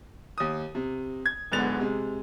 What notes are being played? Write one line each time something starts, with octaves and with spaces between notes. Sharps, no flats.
D#2 D#6
C3
G#6
D1 G#2 D3 B3 A6 F7
C3 G#3